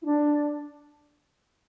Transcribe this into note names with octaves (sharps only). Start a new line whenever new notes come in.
E4
D4